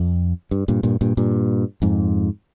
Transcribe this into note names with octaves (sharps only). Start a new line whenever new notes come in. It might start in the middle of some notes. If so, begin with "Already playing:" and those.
Already playing: F2
G2
G2 A#2
G2 A#2
G2 A#2
G2 A#2
F2 G#2